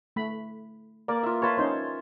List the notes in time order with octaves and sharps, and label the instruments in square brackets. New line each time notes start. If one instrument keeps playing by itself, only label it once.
[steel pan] A3 B5
[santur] A#3 [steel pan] D5
[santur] F4 E5
[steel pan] F4 B4 [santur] C#5 A5 C6
[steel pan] C#4 D#4 C5